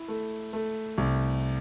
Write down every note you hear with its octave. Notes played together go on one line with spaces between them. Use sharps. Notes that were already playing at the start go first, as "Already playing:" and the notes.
Already playing: E4
A3
A3
C2